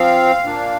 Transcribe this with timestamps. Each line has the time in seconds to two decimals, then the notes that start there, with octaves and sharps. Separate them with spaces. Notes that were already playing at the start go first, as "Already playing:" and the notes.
Already playing: F3 C4 F5
0.43 A#2 A#3 D4